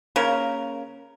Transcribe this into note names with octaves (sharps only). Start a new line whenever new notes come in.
C#3 A#3 A#4